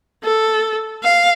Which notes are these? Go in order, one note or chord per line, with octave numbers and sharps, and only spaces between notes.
A4
F5